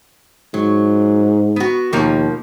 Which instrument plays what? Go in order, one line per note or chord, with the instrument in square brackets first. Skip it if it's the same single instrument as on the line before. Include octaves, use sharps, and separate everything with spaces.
[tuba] G#2 [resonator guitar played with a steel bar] F#3
[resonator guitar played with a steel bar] B3 F#4
[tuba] D#2 [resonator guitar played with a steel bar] B2 F3 A#3